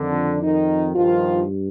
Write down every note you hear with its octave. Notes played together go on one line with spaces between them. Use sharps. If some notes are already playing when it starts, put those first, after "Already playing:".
Already playing: F2 D3 D#3 D4
D#3 D#4
G2 D#3 F3 F4